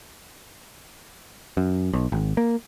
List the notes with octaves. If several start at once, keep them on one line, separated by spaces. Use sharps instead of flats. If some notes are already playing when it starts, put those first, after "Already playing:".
F#2
B1
G#1
A#3